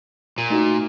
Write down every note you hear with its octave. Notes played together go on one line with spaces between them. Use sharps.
A#2
A3 D#4 F#4